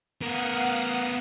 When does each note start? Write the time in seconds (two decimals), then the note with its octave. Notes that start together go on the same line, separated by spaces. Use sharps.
0.21 B3 A#4 F5 F#5 D#6